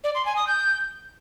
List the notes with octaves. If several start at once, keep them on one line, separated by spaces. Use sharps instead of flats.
D5
C6
G#5
D#6
G6